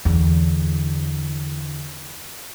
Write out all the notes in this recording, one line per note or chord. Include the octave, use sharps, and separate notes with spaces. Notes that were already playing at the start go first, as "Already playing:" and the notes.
E2 D3